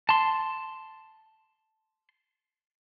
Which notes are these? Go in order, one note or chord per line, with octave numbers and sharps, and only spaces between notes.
A5 C6